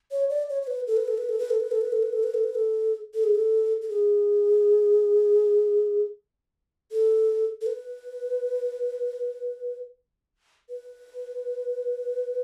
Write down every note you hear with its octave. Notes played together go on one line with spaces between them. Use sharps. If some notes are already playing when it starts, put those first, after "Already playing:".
C#5
D5
C#5
C#5
B4
A4
B4
A4
B4
A4
B4
A4
B4
A4
B4
A4
B4
A4
B4
A4
B4
A4
A4
G#4
A4
A4
G#4
A4
A4
B4
B4